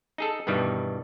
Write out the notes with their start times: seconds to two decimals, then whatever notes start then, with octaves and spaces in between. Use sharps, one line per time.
0.18 D#4 G#4 A4
0.47 G2 B2 D#3 E3 G3